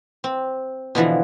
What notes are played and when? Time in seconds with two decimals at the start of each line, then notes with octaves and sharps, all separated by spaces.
0.24 C4
0.95 B2 D3 E3 F3